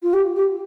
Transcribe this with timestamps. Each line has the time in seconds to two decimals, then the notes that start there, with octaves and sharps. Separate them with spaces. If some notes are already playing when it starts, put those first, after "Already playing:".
0.02 F4
0.13 G4
0.36 G4